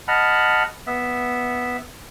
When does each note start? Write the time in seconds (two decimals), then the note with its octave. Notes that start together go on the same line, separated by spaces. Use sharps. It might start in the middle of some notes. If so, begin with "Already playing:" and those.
0.08 D#5 F#5 A5 B5 F6
0.87 B3 E5